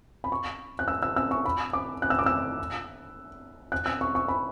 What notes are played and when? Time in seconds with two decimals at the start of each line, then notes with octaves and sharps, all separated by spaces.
0.24 B5
0.32 C#6
0.79 F#6
0.88 E6
1.03 E6
1.16 E6
1.31 C#6
1.45 B5
1.73 D6
2.02 F#6
2.10 E6
2.19 D6
2.26 E6
3.72 F#6
3.86 E6
4.01 C#6
4.15 C#6
4.28 B5